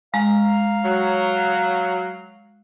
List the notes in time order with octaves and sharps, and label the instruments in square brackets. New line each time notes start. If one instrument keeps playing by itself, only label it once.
[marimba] G#3 [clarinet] F5 [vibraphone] A#5
[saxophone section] F#3